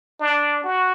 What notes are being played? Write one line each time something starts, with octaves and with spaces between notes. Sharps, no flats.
D4
F#4